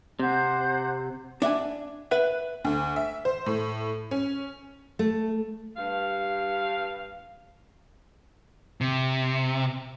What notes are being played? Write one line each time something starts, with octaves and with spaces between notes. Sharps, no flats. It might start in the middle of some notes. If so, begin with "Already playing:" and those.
C3 C5 F#5 G6
D4 E5 F#5 G#5
B4 E5 F#5
D2
E5
C5
A2
C#4
A3
G2 F5
C3